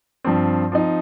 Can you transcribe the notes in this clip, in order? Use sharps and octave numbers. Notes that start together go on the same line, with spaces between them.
G2 F3 C4
F3 C4 D#4